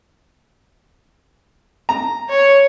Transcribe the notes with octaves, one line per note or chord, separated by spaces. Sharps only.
A#5
C#5